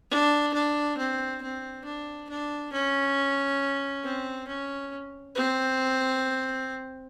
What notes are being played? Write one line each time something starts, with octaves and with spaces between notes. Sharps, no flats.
D4
D4
C4
C4
D4
D4
C#4
C4
C#4
C4